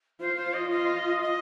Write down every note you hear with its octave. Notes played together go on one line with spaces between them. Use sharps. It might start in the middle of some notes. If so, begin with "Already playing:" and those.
F4 C5
C5
D#5
F4 D#5
D#5